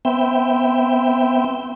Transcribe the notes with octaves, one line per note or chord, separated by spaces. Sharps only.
B3 C4 E5 G5